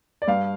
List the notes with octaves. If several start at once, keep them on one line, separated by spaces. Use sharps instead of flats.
D5
G2 F5